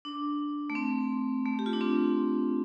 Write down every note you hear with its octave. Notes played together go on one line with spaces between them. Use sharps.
D4
A3
C4
A3
G4
F4
D4
C4